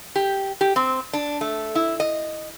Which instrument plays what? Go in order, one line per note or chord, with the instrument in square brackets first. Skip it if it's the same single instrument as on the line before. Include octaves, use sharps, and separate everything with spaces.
[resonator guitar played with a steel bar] G4
G4
C4
D4
A3
E4
D#5